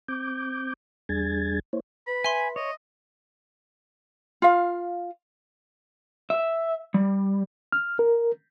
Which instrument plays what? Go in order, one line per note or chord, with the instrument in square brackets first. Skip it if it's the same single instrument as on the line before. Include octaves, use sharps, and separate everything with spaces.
[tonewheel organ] C4 D6 G6
E2 G3 D4 G#4 G#6 A6
A#3 E4 C5 C#5
[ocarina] B4 [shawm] B5
[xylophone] E5 C6 [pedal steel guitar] G#5
[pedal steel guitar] C#5 [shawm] D#5
[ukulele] F4 F5
[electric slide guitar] E5
G3
[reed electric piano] F6
A#4